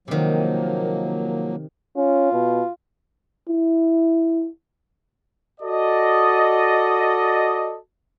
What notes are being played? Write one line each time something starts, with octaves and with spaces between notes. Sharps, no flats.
C3 D#3 F3 F#3 A#3
C#4 F4
B2
E4
F#4 A4 D5 D#5